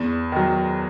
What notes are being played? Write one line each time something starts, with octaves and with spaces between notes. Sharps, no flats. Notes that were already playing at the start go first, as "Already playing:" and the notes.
Already playing: E2
D#3 F#3